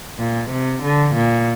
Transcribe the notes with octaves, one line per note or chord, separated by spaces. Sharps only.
A#2
C3
D3
A#2